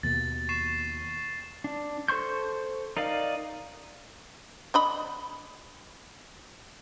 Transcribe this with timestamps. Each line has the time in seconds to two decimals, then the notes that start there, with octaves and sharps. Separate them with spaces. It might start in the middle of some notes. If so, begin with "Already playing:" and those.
0.03 D#2 B2 A#3 A6
0.49 C#6 C7 E7
1.64 D4
2.08 A4 C5 C6 C#6 G6
2.97 D#4 A#4 D5 F5
4.74 D4 D#5 B5